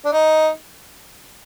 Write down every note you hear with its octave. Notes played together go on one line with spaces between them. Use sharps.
D4
D#4